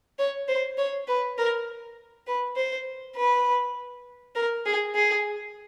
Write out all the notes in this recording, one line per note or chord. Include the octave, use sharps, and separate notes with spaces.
C#5
C5
C#5
B4
A#4
B4
C5
B4
A#4
G#4
G#4